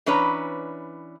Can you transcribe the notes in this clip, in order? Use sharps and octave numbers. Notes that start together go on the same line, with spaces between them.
E3 C#4 D4 B4 C#5 A#5